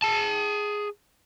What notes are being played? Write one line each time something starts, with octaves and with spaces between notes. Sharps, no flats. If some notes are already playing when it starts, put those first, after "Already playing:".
G#4 A5